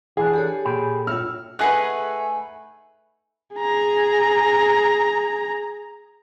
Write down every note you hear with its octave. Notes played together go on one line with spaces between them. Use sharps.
E3 D4 E4 G#4
G4 A4 C#5
A#2 G5 B5
F4 C#5 E6 F6
A3 D#4 G#4 B4 F#5 G#5 F#6
G#4 A#5